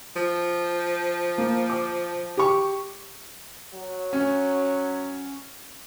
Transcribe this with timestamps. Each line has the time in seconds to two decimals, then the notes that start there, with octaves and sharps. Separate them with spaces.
0.16 F3
1.38 A#3
1.70 D6
2.37 G4 C#6
3.74 F#3
4.13 C#4